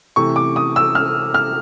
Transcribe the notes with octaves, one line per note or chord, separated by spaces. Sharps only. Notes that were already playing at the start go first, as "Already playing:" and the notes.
C3 E3 A3 C#6
D6
D#6
E6
F6
F6